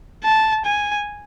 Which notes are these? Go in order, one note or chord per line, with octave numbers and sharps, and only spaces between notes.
A5
G#5